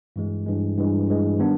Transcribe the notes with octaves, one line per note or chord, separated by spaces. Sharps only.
G2 E3 G#3
G2 E3 G#3
G2 E3 G#3
G2 E3 G#3
D#3 G3 B3 D4